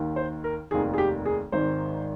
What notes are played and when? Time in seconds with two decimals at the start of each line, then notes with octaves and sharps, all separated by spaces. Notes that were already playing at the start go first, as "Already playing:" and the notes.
Already playing: D#2 D#3
0.16 C5
0.44 A#4
0.71 F1 D#2 D#3 G#4
0.93 G#4
0.98 G4
1.26 G#4
1.52 G#1 G#2 D#3 C5